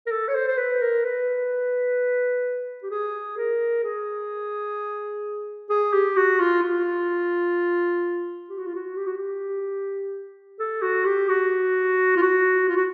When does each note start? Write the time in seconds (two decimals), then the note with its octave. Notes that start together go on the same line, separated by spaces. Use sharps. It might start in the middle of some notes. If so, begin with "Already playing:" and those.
0.07 A#4
0.11 A4
0.28 C#5
0.35 C5
0.48 C5
0.57 B4
0.81 A#4
1.04 B4
2.83 G4
2.91 G#4
3.37 A#4
3.84 G#4
5.70 G#4
5.93 G4
6.17 F#4
6.40 F4
6.63 F4
8.50 G4
8.58 F#4
8.67 F4
8.75 F#4
8.96 G4
9.07 F#4
9.18 G4
10.59 A4
10.82 F#4
11.05 G4
11.29 F#4
12.16 F4
12.22 F#4
12.69 F4
12.76 F#4